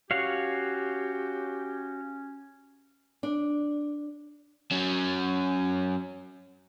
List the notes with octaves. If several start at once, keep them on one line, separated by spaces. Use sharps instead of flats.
C#4 F#4 G4 C#5 F5
D4
F#3 C#4